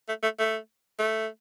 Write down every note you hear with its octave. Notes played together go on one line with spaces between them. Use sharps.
A3
A3
A3
A3